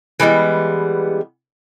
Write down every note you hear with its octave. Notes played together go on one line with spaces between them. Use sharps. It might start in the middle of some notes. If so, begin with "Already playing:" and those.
E3 G3 G#3 B3